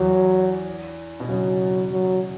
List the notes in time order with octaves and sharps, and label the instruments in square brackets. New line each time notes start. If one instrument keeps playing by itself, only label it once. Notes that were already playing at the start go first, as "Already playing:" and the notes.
Already playing: [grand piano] E2 E3 [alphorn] F#3
[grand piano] B2
[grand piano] C#3 [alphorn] F#3
[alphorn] F#3